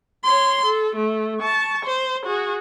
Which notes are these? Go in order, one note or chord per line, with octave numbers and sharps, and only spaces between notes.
C#5 C6
A4
A3
A5 C#6
C5
F#4 G#4